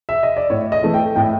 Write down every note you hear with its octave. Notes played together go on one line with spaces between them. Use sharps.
E5
D#5
D5
A2 C#5
D#5
E3 A3
G5
A2 G5